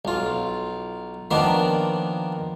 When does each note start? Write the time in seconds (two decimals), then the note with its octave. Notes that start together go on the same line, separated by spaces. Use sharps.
0.05 B1 F4
1.31 D#3 F3 A#3 B3 D4